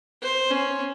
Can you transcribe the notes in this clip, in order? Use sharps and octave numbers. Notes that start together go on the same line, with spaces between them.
C5
C#4